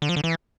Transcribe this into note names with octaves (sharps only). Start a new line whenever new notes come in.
D3
F3
D3
E3